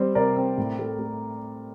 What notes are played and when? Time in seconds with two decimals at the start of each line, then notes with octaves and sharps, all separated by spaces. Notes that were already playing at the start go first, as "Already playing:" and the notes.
Already playing: G3 C4 C5
0.15 C3 A#4 D5
0.36 C4
0.58 A2
0.79 A3
0.99 A3